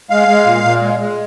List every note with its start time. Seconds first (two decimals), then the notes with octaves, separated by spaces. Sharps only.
0.10 G#3 F5
0.28 G#3
0.46 A#2
0.64 A#2
0.82 G#3
1.00 G#3